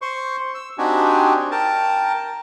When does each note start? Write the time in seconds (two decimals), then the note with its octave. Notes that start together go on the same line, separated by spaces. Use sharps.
0.02 C5 C6 C#6
0.54 E6
0.78 C4 D4 D#4 F#4 G4 G#5
1.51 A#4 G5 A5